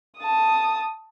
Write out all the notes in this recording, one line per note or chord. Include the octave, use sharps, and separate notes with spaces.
A5 D#6